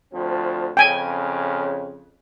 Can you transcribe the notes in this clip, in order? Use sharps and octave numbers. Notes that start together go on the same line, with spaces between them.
D2 F3 C4
F2 C#3 G5 G#5